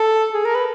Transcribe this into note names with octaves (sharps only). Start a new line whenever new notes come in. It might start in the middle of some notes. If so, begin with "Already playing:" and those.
Already playing: A4
G#4
A#4
B4